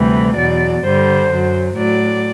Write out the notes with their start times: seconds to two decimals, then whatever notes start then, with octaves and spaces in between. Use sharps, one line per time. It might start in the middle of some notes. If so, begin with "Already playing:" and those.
Already playing: D2 C3 E3 G3
0.37 E2 B2 F#3 D5
0.84 G2 D3 G3 C5
1.30 F#2 F#3
1.76 A2 F#3 D5